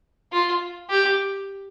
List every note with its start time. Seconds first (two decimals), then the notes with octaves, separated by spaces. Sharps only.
0.32 F4
0.90 G4